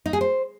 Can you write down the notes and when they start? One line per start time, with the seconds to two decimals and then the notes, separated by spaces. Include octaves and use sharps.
0.06 D#4
0.13 G#4
0.21 C5